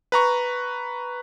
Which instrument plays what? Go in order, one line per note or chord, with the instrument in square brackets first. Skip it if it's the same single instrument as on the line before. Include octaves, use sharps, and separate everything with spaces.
[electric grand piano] B4 A#5 C#6